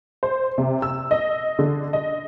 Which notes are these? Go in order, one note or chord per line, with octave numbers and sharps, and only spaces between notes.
C5
C3
E6
D#5
D3
D#5